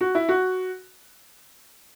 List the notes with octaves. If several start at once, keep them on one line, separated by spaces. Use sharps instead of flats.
F#4
E4
F#4